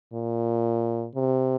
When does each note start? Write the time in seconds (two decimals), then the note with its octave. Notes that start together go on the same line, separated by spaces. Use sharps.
0.13 A#2
1.16 C3